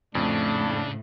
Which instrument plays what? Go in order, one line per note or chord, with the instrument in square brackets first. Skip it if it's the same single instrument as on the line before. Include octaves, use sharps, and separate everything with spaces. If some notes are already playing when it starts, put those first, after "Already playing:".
[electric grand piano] F2 [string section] A2 [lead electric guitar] C#3 [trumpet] D4